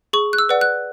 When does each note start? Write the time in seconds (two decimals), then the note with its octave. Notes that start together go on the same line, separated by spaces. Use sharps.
0.13 G#4 C#6
0.33 F#6
0.38 E6
0.49 B4 D5 F#5
0.61 F#6